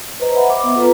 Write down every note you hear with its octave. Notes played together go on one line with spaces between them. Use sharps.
B4 C5 D#5 A#5
E5 F#5 B5
D6
B3
F4 A4 B4 A#5